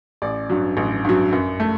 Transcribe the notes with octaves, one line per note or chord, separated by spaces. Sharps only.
A1 D5
G2 F#3
A1
G2 F#3
F#2
A3